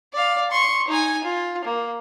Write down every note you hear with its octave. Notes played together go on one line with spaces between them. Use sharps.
D5 F5
C6 C#6
D#4 G#5
F4
A#3